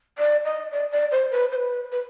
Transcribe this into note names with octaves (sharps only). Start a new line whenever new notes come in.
D5
D#5
D5
D5
C5
B4
C5
B4
B4